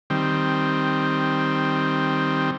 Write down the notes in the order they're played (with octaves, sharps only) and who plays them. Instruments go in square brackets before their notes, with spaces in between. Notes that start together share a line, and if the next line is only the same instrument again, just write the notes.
[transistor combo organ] D#3 G3 C4